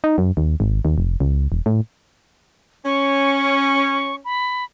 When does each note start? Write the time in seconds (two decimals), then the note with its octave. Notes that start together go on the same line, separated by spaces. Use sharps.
0.04 D#4
0.18 F#2
0.37 D#2
0.60 G#1
0.85 D#2
0.98 F1
1.20 C#2
1.52 E1
1.66 A2
2.85 C#4 C#6
4.25 B5